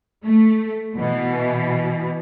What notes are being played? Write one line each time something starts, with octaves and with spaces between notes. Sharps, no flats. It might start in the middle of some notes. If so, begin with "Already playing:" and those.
A3
B2 E3